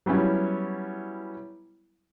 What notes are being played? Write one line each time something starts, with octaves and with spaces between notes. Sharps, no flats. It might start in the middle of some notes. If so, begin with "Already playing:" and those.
F#3 G3 B3 C#4 E4